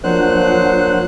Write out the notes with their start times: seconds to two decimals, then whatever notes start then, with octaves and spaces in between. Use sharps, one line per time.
0.04 F3 F#3 A#3 D4 C5 F#5 F#6